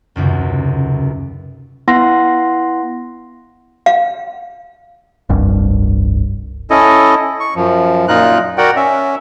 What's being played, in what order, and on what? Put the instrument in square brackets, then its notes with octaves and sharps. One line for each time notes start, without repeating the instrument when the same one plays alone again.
[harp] D#1 C#2 F#2 C3
[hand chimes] B3 E4 F#5 C6 A#6
[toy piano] F5
[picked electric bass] F1 C2 G2
[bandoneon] C#4 E4 A4 D#5
C#6
F#2 F3
F#2 A#2 D#4 F4 A#4 F#6
F#4 A#4 D5 F#5 G5
C#4 E5